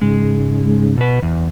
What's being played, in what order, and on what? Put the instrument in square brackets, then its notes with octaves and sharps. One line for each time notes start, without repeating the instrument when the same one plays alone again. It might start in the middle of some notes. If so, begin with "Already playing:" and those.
[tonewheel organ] G#2 C#3 [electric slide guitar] G#3
[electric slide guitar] B2 B4
E2